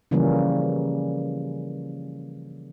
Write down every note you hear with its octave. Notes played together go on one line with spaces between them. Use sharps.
C#3 E3 F3 G3 A#3 C#4